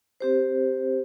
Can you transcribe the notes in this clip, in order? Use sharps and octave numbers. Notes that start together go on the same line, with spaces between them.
C4 G4 C5